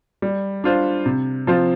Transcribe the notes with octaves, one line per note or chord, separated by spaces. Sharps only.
G3
D4 F4 C5
C3
F3 C4 F4 C5